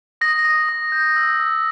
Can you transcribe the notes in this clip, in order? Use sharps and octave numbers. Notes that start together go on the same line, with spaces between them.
D#6 A#6
D#6
D#6
G6
E6
E6